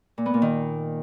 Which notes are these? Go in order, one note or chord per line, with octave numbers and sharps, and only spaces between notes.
A#2
B3
A#2
D#3